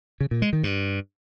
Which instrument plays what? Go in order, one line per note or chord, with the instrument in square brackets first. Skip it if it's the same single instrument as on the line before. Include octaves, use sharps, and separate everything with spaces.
[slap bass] C#3
A#2
G#3
D#3
G2